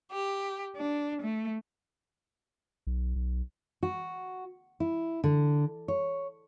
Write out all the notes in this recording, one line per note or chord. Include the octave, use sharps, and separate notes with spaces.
G4
D4
A3
B1
B1
F#4
E4
D3
C#5